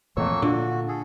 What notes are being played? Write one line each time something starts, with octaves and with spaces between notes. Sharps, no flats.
F2 A#2 E3 A3 A#3 C#5 C#6 E6
A#2 D3 F4 F#4
G#4 A4